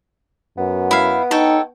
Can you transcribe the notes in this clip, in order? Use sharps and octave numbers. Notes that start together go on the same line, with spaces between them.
F#2 B3
E4 F5
D#4 A4 C#5 G5